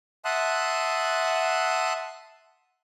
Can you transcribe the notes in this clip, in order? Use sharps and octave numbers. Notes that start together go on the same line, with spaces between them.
E5 F#5 A5 C6 D#6 F#6